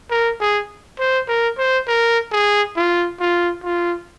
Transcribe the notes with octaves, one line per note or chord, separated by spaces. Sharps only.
A#4
G#4
C5
A#4
C5
A#4
G#4
F4
F4
F4